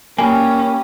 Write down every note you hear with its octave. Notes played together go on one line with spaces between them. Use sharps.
G3 A#3 C#4 G4 G#5